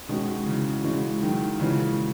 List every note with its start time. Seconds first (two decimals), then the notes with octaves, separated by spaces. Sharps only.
0.08 B2 D#3 G#3 C#4 F#4
0.46 C#3 E3
0.84 C#3 E3 G#3 C#4 F#4
1.22 D#3 F#3
1.59 A#2 C#3 E3 G#3 C#4 F#4 B4